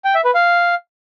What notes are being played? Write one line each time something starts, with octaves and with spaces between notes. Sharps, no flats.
G5
E5
B4
F5